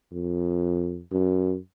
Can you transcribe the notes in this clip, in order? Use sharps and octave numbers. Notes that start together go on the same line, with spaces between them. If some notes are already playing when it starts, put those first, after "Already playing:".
F2
F#2